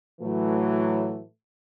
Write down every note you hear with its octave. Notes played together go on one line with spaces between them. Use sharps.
A2 E3 F#3 A3